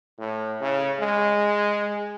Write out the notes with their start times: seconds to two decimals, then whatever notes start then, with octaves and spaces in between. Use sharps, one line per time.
0.18 A2
0.61 C#3
1.00 G#3